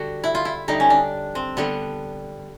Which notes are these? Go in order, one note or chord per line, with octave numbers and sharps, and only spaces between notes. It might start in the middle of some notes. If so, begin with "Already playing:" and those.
Already playing: D3 G3 F#4
E4
F4
E4
D3 G3 D#4
C#4
D4
C4
D3 G3 B3